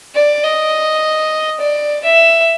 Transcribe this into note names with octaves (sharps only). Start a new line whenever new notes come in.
D5
D#5
D5
E5